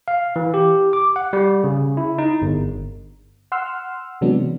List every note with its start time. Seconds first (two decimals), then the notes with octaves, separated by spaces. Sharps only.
0.08 F5
0.36 E3
0.54 G4
0.93 D6
1.16 F#5
1.33 G3
1.64 C#3
1.97 E4
2.18 D#4
2.42 G1
3.52 F#5 C6 E6 F6
4.21 C3 E3 F#3 G#3 B3 D4